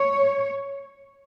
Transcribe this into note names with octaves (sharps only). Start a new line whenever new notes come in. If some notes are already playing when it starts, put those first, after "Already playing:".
Already playing: C#5